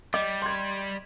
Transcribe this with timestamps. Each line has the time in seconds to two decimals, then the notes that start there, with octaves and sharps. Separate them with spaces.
0.14 G3 D#5 D6
0.42 C6 G#6